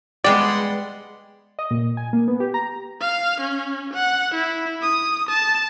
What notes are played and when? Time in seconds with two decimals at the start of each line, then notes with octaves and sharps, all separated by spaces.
0.24 G3 G#3 B3 G#4 D5 F#5 G5 C6
1.59 D#5
1.71 A#2
1.97 G#5
2.13 A#3
2.28 B3
2.40 G4
2.54 A#5
3.00 F5
3.40 C#4
3.93 F#5
4.34 E4
4.82 D#6
5.29 A5